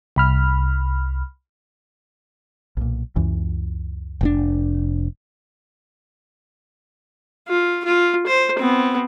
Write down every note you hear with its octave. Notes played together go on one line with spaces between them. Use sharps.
C2 B5 F6
B1 A#2
C#2 F#2 E3
F1 C3 D4
F4
F4
C5
B3 C4